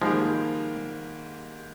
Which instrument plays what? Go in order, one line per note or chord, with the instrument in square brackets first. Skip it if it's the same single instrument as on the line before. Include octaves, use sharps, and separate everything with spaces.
[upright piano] G#2 D#3 G3 A#3 [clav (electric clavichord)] F3 G#3